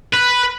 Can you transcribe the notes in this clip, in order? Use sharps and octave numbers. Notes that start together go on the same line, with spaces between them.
B4